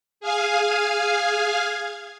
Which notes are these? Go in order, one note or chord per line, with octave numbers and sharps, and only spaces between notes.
G#4 F5 G#5